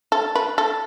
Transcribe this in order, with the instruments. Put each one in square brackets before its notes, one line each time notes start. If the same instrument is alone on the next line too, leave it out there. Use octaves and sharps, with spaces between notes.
[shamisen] A4
B4
A4